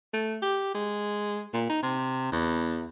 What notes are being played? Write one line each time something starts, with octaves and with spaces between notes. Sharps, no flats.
A3
G4
G#3
A#2
D#4
C3
E2